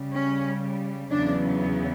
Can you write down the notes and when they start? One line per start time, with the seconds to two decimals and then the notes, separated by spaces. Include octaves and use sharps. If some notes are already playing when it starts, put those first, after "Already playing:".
Already playing: C#3 G3
0.14 C#4
1.11 E2 C#3 F#3 B3 D4